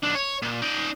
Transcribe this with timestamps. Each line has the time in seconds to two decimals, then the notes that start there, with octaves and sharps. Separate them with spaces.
0.03 B1 D4
0.15 C#5
0.42 A#2
0.62 D#4 D5